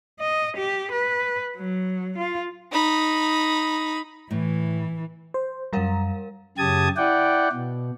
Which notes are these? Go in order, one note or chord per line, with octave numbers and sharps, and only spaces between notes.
D#5
G4
B4
F#3
F4
D#4 B5
A2 E3
C5
F#2 G3 A#4 F5 A#5
F#2 C#3 G4 A5 D#6 G#6
E4 D5 F#5 G5
B2